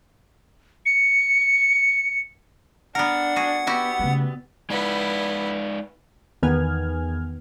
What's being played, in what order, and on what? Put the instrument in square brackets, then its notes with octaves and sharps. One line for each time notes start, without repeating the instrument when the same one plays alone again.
[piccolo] C#7
[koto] B3 A#4 [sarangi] D4 [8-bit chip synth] F#5
[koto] F#4 G#4
[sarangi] B3 [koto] E4 F#4 G4
[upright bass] C#3 A3
[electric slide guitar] G#3 D#4 D5 [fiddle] B3 E4
[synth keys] E2 D#3 B3 G#5 F6 G#6